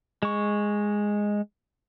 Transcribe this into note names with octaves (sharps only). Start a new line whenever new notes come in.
G#3 C#6